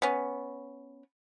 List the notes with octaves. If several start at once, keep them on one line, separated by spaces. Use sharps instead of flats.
B3 C#4